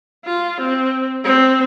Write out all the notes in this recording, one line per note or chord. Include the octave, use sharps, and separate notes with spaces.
F4
C4
C4